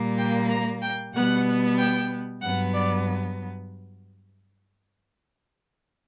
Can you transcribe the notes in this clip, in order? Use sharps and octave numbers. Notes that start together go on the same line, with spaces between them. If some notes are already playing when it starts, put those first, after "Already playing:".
Already playing: A#2 G3 A#3
G5
A#5
G5
B2 G3 B3 F#5
G5
G2 F#3 B3 F#5
D5